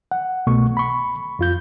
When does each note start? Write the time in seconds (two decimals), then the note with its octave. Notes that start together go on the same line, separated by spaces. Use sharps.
0.11 F#5
0.47 C2 B2 A3 B3 C#6
0.77 B5 C#6
1.39 F2 F4 G6